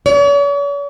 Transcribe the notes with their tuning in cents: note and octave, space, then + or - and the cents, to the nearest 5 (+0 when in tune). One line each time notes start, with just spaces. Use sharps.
C#5 +45